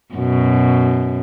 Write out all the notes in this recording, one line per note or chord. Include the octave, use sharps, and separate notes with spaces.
F#2 B2